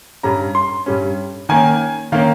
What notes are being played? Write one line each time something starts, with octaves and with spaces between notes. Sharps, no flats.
G2 G3 C#4 A#5
C6
G2 G3 C#4
D#3 A#3 C#4 G#5
D#3 A#3 C#4 F5